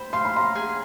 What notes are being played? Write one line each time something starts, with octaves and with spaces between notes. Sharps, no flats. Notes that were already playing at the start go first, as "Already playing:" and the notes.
Already playing: C5 B5
F5 C6
B5
A#5 C6
G#4